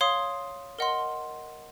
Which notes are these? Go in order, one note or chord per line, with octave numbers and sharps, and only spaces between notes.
C#5 F5 C6 D#6
A#4 D#5 F#5 C6